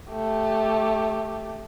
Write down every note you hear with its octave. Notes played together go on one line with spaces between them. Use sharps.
A3 G4